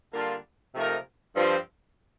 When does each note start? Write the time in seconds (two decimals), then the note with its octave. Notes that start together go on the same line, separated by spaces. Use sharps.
0.13 D3 G3 A#3 D4 F4
0.74 C3 F3 A3 D#4 A#4
1.34 G2 F3 C4